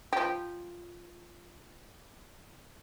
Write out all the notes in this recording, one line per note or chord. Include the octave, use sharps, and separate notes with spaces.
F3 G4